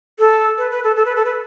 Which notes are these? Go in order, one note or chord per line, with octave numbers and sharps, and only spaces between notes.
A4
B4
B4
A4
A4
B4
A4
B4